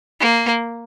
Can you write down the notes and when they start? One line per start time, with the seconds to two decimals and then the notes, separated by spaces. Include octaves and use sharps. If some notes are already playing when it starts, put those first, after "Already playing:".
0.20 A#3